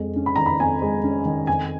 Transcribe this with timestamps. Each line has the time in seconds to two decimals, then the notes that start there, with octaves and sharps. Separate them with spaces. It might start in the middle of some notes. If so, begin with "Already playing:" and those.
Already playing: F2 G#3
0.16 C#4
0.26 B5
0.36 D#3 A#5
0.46 B5
0.60 F2 G#5
0.82 G#3
1.04 C#4
1.25 D#3
1.47 F2 G#5